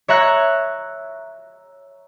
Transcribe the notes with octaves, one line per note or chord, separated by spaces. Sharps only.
C#5 E5 A#5 F#6 G#6 C#7